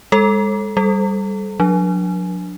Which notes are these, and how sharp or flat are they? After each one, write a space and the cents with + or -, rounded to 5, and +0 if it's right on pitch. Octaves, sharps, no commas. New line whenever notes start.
G#3 -35 A4 +0
G3 +0 A4 -25
F#3 -40 D4 +0